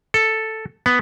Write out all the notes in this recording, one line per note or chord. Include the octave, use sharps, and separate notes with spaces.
A4
B3